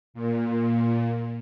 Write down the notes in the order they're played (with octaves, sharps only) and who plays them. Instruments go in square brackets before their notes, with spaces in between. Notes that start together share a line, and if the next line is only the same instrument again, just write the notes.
[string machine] A#2